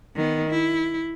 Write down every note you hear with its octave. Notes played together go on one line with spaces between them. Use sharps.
D#3 B3
E4